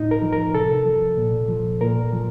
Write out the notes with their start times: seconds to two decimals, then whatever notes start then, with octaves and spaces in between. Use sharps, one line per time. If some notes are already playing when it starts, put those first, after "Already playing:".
Already playing: A2 D#4
0.11 A#4
0.22 F3
0.32 A#4
0.55 C3 A4
0.85 F3
1.17 A#2
1.49 F3
1.81 A#2 A#4
2.13 F3